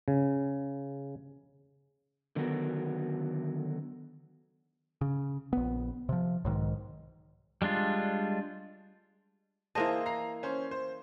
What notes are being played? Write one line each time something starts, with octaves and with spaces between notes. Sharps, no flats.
C#3
D3 D#3 F#3 B3 F#4 A#4
C#3
A#1 B3
C3 F3
B1 G#2 D#3
G3 G#3 D4 F4
E3 A#3 G#4 C5 D#5 A5
A#5 C7
C#4 C5
C5